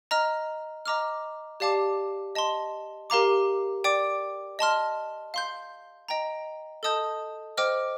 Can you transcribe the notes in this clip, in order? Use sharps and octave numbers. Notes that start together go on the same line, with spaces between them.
D#5 A#5 F6
D#5 A#5 D6 F6
G4 D5 F5 A5 D6
D#5 A5 C6
G4 A#4 F5 A#5 D6
D5 G5 D6
D#5 A5 C6 F6
F5 C6 G6
D#5 G5 A#5
A4 D#5 A5 D#6 G6
C5 D#5 G5 D6 F6